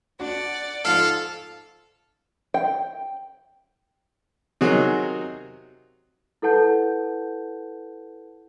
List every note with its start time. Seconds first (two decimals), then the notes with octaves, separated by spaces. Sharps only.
0.20 D4 F#4 D5 F#5
0.85 G#2 F3 F4 A4 F5
2.54 G5
4.61 C3 D#3 F#3 D#4 F#4 G#4
6.42 E4 A4 B4 F#5 A5 G6